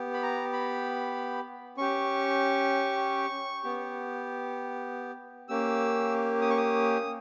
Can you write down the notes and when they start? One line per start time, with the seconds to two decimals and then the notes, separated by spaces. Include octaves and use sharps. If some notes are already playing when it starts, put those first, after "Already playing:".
Already playing: B3 G4
0.14 B5
0.23 A#5
0.53 B5
1.77 C#4 G4 C#6
3.63 B3 G4
5.49 A#3 C#4 G4 E6
6.41 D#6
6.50 C#6
6.58 D#6